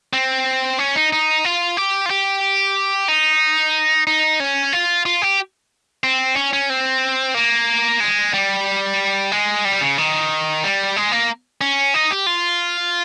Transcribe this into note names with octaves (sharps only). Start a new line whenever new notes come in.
C4
C#4
D#4
D#4
F4
G4
F4
G4
D#4
D#4
C#4
F4
F4
G4
C4
C#4
C#4
C4
A#3
G#3
G3
G#3
G3
C#3
D#3
G3
G#3
A#3
C#4
D#4
G4
F4